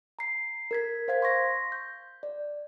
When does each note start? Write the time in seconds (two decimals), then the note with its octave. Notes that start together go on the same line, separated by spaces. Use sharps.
0.19 A#5 C7
0.71 A#4 G#6 B6
1.08 C5 F5 G#6 B6
1.22 C6 C#6 A#6 B6
1.72 G6
2.23 D5